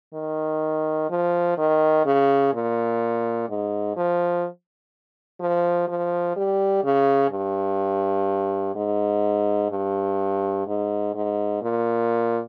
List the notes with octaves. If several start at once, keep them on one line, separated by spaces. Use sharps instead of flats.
D#3
F3
D#3
C#3
A#2
G#2
F3
F3
F3
G3
C#3
G2
G#2
G2
G#2
G#2
A#2